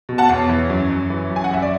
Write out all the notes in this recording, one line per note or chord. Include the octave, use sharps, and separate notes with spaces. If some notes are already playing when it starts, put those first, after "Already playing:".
B2
F#5 A5
E2 C#5
E3
F#2
F#2
E3
F#2
G#5
F#5
F#2 E5
D5